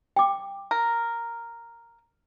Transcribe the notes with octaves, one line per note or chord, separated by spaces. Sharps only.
G5 D6
A#4